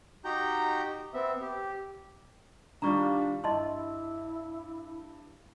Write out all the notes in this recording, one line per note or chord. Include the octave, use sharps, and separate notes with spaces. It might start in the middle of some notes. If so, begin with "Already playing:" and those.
D#4 F#4 G4 G5 A#5 G6
B3 C4 E5
G4
D#3 G3 D4 F4 A#5 C#6
G2 E4 D#5 A5 C6